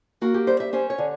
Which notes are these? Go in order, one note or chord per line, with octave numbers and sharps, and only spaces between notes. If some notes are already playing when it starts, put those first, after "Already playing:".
A#3 F#4
G4
G3 C5
E5
C#4 C5
C#5
D3